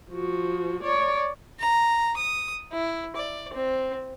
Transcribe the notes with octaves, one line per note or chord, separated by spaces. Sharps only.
F3 F#4
C#5 D5
A#5
D#6
E4
D5
C4